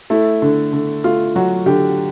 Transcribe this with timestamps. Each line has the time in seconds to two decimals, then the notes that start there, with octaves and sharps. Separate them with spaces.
0.10 A3 E4
0.42 D3
0.73 D3
1.04 A3 F4
1.36 F#3 F#4
1.66 D3 G4